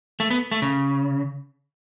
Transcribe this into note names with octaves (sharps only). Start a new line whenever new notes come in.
A3
B3
A3
C#3